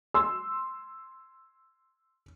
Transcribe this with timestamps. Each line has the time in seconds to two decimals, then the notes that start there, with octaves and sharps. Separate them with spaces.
0.14 C6 E6